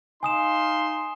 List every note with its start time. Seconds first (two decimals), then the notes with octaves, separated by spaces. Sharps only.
0.23 D#4 F5 G#5 C6 D#6 E7